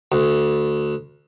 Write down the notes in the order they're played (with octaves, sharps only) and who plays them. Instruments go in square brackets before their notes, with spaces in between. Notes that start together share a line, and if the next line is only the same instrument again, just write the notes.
[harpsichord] D2